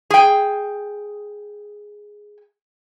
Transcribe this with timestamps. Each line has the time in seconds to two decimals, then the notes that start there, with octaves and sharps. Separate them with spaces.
0.10 G#4 G5